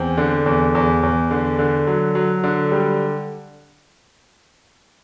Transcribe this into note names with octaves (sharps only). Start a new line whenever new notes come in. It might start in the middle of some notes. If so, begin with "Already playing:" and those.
Already playing: E2 C4
D3
E2
E2
E2
D3
D3
F#3
F#3
D3
G3